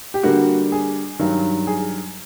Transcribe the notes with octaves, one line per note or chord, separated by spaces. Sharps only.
G4
D3 G3 A#3 F#4
G#4
G2 D#3 F#3
G#4